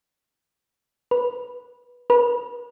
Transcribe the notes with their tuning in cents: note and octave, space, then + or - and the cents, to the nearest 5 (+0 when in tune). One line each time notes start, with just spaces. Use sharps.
B4 -15
B4 -35